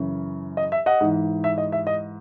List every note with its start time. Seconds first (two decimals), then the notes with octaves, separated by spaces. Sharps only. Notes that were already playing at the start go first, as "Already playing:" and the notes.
Already playing: F#2 C#3 E3
0.57 D#5
0.72 E5
0.86 D#5 F#5
1.01 G#2 E3
1.44 E5
1.58 D#5
1.72 E5
1.87 D#5